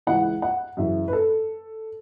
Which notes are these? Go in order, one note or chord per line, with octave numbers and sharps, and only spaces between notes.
C#2 C#3 E3 F#5
F#5
F#2 C#3 E3 E5
B4
A4